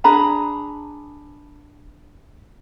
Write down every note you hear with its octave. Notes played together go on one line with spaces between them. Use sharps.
D4 G#4 A#5 B5